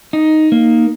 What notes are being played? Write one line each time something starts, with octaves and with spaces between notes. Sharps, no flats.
D#4
A#3